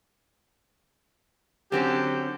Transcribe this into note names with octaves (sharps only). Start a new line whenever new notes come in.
D3 F#3 C4 C#4 G4